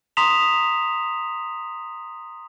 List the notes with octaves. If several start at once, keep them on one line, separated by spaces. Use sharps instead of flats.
A#5 C6 D#6 B6 E7 F7